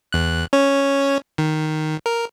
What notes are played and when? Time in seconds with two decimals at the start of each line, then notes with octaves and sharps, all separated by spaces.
0.13 E2 F#6
0.53 C#4 C#5
1.38 D#3
2.06 A#4